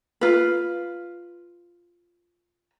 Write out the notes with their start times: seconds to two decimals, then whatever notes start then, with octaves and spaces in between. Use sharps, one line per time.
0.21 F4 B4